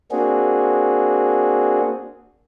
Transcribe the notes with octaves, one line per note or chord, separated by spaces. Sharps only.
A#3 C4 D4 F#4 G#4